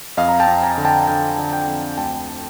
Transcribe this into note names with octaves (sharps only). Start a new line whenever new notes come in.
F2 D#5 F5
A#5
G5 A5
F2
G#5 A#5
D3
G5 A5
D3 F5 G5
D3
G5 A5
F2
D2 G5 A5